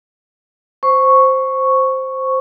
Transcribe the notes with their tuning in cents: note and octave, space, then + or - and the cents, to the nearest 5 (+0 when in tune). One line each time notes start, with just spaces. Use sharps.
C5 +0 C#6 +0